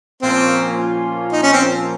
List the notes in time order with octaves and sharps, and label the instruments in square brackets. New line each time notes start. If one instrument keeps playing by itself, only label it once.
[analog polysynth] A#2 F3 A#3 C#4 F4 [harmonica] C4
[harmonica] D#4
C#4
C4